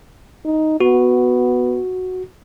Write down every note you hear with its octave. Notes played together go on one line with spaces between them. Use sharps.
D#4
B3 F#4